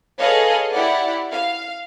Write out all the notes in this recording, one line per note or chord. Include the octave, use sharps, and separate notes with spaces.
G#4 A4 B4 C#5 D#5 F5
E4 G4 D5 F#5
F5